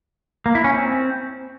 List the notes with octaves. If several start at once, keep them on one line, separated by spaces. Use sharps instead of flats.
A#3
E4
C#4
C4